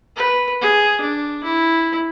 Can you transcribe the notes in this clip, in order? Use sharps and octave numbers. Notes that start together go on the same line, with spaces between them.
B4
G#4
D4
E4